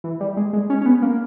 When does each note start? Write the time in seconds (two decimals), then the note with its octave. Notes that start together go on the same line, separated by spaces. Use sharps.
0.04 E3
0.20 G3
0.37 G#3
0.53 G#3
0.70 C#4
0.81 C#4
0.86 B3
1.02 A#3